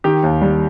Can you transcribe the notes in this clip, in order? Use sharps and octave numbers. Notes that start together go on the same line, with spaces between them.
D#3 G4
D#2
G3